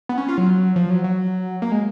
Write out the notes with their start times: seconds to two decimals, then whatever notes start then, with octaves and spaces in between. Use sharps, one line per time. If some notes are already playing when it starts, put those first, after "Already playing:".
0.09 B3
0.18 C#4
0.28 F4
0.38 F#3
0.76 F3
0.90 F#3
1.04 F#3
1.62 A#3
1.72 G#3